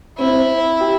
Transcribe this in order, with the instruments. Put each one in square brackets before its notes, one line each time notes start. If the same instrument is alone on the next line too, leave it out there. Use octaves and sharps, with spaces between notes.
[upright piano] C4 [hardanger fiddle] E4
[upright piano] G4